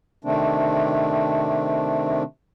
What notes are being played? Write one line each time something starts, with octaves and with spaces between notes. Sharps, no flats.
C3 D#3 A3 C4 D4